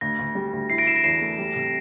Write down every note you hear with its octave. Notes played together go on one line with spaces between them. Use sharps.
D2 A#6
D2
G3
D2
E4 C7
A#6 D7
E4 C7 E7
A#6 D7
E2 C7 E7
A3
G3
C3